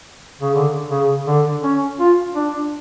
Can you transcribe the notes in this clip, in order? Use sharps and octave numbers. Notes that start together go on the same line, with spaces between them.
C#3
D3
C#3
D3
C#4
F4
D4